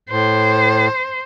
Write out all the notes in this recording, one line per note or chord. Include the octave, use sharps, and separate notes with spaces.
A2 C5